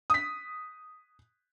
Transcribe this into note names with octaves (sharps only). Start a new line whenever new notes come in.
D#6 B6